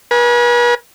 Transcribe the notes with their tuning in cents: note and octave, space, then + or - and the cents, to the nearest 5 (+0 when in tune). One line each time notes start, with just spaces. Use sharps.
B4 -45 G#5 +5